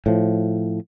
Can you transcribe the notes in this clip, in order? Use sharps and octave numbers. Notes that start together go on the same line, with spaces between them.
A2 F3